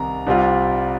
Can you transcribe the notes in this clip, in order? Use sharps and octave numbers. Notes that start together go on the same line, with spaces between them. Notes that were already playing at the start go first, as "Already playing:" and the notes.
Already playing: C2 C3 D#3 A#5
C2 C3 G3 C4 F4